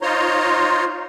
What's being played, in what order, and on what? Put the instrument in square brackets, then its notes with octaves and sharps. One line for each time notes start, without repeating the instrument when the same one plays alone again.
[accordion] D#4 F4 C5 C#5 A#5 C6